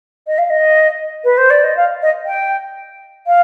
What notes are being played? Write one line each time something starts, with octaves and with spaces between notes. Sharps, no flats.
D#5
F5
D#5
B4
C5
D5
D#5
F5
D#5
G5
F5